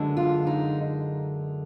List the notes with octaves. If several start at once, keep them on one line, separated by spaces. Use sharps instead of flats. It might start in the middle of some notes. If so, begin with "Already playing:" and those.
Already playing: F#2 D3 G#3
F4
D#4